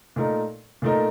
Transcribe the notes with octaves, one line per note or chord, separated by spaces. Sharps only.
A#2 A3 D#4 A#4
A#2 A3 D#4 A#4